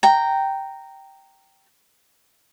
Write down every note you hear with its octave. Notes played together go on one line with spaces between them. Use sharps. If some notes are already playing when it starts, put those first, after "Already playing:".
G5 A#5